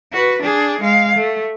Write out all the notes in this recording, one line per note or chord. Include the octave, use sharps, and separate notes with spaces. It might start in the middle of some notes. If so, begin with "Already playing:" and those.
F#4 B4
D4 G#4
G#3 F5
A3